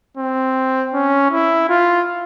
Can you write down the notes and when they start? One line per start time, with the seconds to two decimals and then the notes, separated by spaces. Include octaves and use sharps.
0.18 C4
0.94 C#4
1.31 E4
1.69 F4